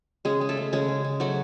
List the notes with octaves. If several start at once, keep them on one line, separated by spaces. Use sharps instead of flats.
C#3 G#3 G#4
G#3
A3 A4
C#3
C#3 G#3 G#4
C#3
G#3
F#3 A3 F#4